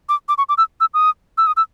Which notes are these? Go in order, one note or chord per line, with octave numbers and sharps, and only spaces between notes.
D6
D6
C#6
D6
E6
E6
D#6
E6
D#6
E6